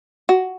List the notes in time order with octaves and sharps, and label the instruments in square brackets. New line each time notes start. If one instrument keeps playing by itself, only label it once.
[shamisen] F#4